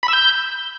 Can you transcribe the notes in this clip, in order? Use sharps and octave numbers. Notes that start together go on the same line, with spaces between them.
B5
E6
G6